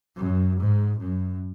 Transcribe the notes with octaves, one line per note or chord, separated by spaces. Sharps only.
F#2
G#2
F#2